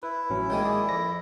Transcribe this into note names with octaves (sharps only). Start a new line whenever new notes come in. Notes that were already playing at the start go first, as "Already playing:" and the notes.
E4 B4
A1 F#3 C#4
D#3 G#3 A#3 G5 G#5
G#4 D5
F2 A#6